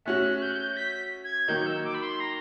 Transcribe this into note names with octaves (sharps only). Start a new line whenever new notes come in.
A3 C#4 F#4 F#6
G6
B6
G#6
D#3 F#3 A#3 D#4 G6
E6
D6
B5
C6
A#5